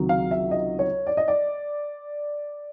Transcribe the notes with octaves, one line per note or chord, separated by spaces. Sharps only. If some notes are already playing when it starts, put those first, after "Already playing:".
Already playing: C#2 C3 D#3 F#3
F5
E5
D#5
C#5
D5
D#5
D5